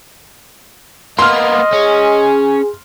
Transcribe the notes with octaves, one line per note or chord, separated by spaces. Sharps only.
A#3 B3 D#5 C6 F6
C#4 G#4